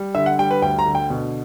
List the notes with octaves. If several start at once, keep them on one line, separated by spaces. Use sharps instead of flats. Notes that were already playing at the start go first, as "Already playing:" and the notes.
Already playing: G3
D3 E5
F#5
G3 G5
B4
D2 G5
A#5
D3
G5
B2